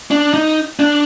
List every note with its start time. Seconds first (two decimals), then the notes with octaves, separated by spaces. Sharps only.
0.11 D4
0.34 D#4
0.79 D4